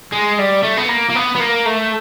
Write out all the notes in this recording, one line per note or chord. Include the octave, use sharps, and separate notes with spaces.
G#3
G3
A3
B3
A#3
A#3
B3
B3
A#3
A3